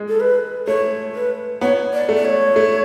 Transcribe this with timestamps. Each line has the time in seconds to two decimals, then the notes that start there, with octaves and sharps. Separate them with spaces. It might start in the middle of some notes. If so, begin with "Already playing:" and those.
Already playing: G#3
0.08 A4
0.20 B4
0.67 A3 C#5
1.15 B4
1.61 B3 C#5
1.93 D5
2.09 A3
2.16 D5
2.25 C#5
2.56 A3